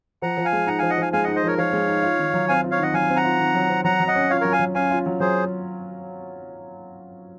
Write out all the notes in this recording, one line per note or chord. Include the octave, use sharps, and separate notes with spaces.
F3 F#5 A#5
F3
F5 G#5
G#3
D#4 F#5 A#5
F3 F5 G#5
D#5 F#5
F3 F5 G#5
G#3 F5 G#5
D#4 D#5 F#5
C5 D#5
F3 A#4 C#5
F3 C#5 F5
G#3
D#4
F4
D#3
F#3
C4 F5 G#5
F4
C#5 F5
D#3 D#5 F#5
F#3 F5 G#5
C4
F#5 A#5
F4
D#3
F#3
C4
F#3 F#5 A#5
F#3
D#5 F#5
C#4
F4 C#5 F5
F#3 A#4 C#5
F5 G#5
F#3
C#4 F5 G#5
F4
F#3
F#3 G#4 C5